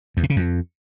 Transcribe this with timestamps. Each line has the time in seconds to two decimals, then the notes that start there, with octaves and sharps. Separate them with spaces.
0.17 E2
0.23 C3
0.30 C#3
0.36 F2